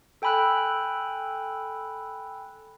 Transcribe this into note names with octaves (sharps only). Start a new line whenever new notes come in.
A4 G5 G#5 B5 E6 F#6